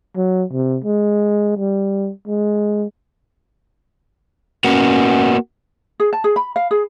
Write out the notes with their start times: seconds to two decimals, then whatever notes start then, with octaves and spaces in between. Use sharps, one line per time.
0.16 F#3
0.52 C3
0.84 G#3
1.58 G3
2.27 G#3
4.64 A#3 B3 C#4 F#4
6.00 G#4
6.13 A5
6.24 G#4
6.36 B5
6.56 F5
6.71 G#4